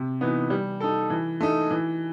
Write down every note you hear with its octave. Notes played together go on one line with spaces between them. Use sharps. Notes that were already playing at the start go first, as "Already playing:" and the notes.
Already playing: C3
E3 B3 D#4
G3
D#4 A4
E3
A3 D#4
E3